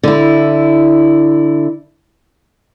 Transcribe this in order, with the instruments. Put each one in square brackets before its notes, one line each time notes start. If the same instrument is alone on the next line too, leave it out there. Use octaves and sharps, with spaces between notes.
[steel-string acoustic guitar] D3 E4